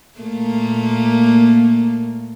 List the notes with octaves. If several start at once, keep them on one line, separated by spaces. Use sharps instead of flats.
A#2 A3 A#3